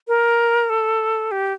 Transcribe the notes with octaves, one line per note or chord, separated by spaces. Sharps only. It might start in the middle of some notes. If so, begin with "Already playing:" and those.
A#4
A4
G4